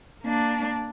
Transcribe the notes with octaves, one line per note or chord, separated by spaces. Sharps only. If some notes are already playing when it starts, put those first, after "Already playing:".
A#3 D4